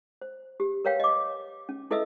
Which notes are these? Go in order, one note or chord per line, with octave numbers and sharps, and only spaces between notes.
C5
G4
A#4 B4 C#5 F5 G5
D#5 D6
C#4
E4 A4 B4 D#5 E5 E6